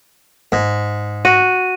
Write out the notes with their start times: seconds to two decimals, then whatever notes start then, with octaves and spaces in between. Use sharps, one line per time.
0.52 G#2
1.25 F#4 D#7